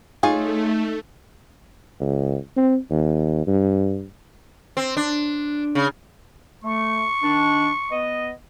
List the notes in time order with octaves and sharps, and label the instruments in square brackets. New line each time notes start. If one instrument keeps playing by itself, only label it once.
[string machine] A3 [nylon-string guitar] D#4 [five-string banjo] F4 G#4 C#5
[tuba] C#2
C4
D#2
G2
[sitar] C4
D4
C#3
[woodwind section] A3 [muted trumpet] C#6
[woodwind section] D#3 D4
B3 D#5